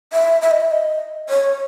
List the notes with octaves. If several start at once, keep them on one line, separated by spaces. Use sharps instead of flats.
E5
E5
D#5
E5
D#5
C#5